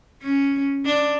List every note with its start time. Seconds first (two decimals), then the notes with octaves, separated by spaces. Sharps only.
0.22 C#4
0.85 D4